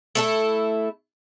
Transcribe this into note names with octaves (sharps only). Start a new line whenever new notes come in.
A3 E4 A4